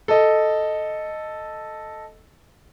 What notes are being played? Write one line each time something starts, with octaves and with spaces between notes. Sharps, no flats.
A4 D#5